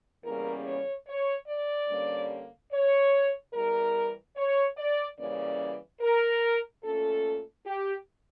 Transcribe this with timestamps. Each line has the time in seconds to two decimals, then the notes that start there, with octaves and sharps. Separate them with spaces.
0.24 E2 C#3 G3 A#3 C#4 A#4
0.66 C#5
1.07 C#5
1.48 D5
1.89 G2 D3 G3 A#3 C#4
2.72 C#5
3.53 E2 E3 G3 A#4
4.36 C#5
4.77 D5
5.19 C#3 E3 G3 A#3 C#4 D5
6.01 A#4
6.83 A#2 A3 C#4 A4
7.66 G4